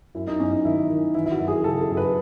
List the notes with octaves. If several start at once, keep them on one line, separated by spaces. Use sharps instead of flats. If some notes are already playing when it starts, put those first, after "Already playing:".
F#2 E4
D#4
F#2 C#4
D#4
D#3 E4
D#3
E3 E4
E4
F#4
F#2
G#4
C#3 A4
A4
F#2
B4